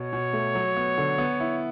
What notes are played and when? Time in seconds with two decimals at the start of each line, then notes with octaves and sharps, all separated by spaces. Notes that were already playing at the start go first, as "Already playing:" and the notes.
Already playing: B2 C#5
0.13 B2
0.33 A3
0.55 F#3
0.77 B3
0.97 D3
1.18 B3
1.40 E4